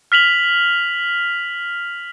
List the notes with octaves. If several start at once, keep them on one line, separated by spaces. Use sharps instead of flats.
F6 B6 F7 F#7